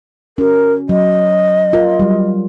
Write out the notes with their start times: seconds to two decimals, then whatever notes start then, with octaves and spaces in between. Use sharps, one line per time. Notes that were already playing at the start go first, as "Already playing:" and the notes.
0.38 C#4 F#4 A#4
0.89 F#3 D#5
1.73 F4 A#4
1.99 F#3 G3